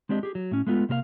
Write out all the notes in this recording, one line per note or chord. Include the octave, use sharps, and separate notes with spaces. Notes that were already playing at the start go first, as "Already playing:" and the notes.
G#3 C4 D4 G4 D#5
G4 G#4
F#3
A2 C#4
G#3 A3 B3 F4
C3 A#3 A#4 F5